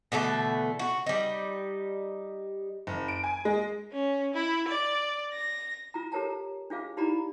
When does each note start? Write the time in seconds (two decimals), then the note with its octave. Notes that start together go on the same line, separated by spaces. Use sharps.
0.12 B2 D3 E3 A3
0.79 F#4
1.06 G3 D#4
2.87 F#1
3.08 D7
3.24 G#5
3.45 G#3
3.92 C#4
4.34 E4
4.68 D5
5.33 A#6
5.94 F4 A#5
6.12 G4 A4 A#4 C#5 A5 A#5
6.70 D4 F4 G#4 F5
6.97 D#4 E4 G4 D5 A#5 B5